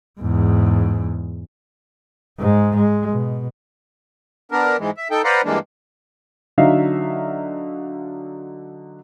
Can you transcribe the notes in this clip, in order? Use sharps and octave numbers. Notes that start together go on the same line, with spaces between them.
E2 G#2
G#2 G#3
G#3
B2
B3 D4 A#4
G#2 E3 G#3
E5
D#4 A4 G5
B4 C5 D5 F5 F#5 A#5
G2 E3 G#3 A#3 D4
D3 F#3 D#4 E5 F5